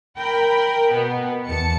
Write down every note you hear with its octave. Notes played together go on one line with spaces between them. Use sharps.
A#4 G5 B5
B2 B3
E2 A5 C#7